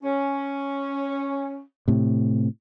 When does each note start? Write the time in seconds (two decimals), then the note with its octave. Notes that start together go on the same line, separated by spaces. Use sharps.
0.03 C#4
1.88 A2 C3